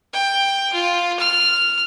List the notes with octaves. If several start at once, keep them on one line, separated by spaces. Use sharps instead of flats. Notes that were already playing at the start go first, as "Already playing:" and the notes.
G5
F4
F6